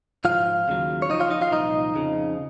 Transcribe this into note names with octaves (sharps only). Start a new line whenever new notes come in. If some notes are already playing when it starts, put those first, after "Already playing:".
G#2 F3 F4 F5
D#2 C#3 F#3
C#5
F#2 F3 D#4 D#5
F4 F5
D#4 D#5
F4 F5
C2 A#2 F3 D#4 D#5
F2 C#3 F3